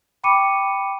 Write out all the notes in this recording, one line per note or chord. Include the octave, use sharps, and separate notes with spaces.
G5 B5 C#6 D6 C#7 D#7